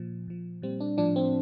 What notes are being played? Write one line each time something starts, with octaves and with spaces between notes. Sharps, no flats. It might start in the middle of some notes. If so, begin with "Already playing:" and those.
Already playing: A#2 F3
A#2 F3
A#2 G3 C4
D4
A2 F3 D4
C4